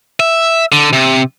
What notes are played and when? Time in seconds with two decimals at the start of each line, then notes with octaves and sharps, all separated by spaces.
0.20 E5
0.72 D3
0.93 C3